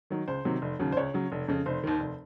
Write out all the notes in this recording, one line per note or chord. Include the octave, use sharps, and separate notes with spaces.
D#3 F#3
C#2 C5
C3 D#3 F#3
F1
D#2 C#3 F#3
C5
C#2 C#5
C#3 F#3
F1
F2 C#3
F1 C5
D#2 D#3
F1